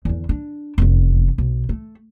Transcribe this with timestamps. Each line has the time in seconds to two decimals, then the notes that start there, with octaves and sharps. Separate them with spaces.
0.05 E2 D3
0.29 D4
0.78 F1 E2
1.38 B1
1.69 A3